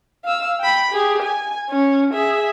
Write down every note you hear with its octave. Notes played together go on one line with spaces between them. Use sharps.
F5 E6
G5 B5
G4 G#4
G#5
C#4
G#4 E5